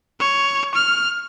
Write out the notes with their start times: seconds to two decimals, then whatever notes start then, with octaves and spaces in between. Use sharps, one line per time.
0.20 C#5
0.75 F6